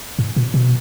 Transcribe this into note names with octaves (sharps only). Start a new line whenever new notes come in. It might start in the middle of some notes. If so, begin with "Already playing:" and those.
G#2
A#2
B2